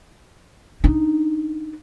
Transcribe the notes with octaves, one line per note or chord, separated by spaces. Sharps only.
D4 D#4